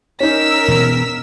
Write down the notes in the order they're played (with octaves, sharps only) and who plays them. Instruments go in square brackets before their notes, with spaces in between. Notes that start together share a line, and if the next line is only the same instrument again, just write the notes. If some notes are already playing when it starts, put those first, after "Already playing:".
[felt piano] C#4 D#4 [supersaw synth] A#4 E6 [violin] B6 E7
[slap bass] B2 E3 B3